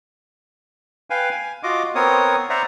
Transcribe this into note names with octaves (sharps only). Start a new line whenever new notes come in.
B4 F5 G5 G#5
G#5
F4 F#4 D#5 D6
B3 C4 A#4 C#5 D#6
C5 D5 E5 F#5 A#5